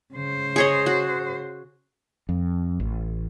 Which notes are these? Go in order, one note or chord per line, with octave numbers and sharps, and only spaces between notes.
C#3 C5
G#4 C#5 D#5
F#4
F2
A1